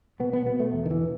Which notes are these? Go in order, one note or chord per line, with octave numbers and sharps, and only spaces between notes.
B2 B3
B3
B2 B3
A3
E2
D#3
E3